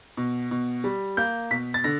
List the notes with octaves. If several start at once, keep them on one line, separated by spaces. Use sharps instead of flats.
B2
B2
G3
A#3 G6
B2 B6
A6
D3 A#6